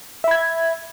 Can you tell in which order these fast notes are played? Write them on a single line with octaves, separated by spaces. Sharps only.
E5 B5 G#6